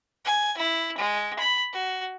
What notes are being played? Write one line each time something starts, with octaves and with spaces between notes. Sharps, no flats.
G#5
E4
G#3
B5
F#4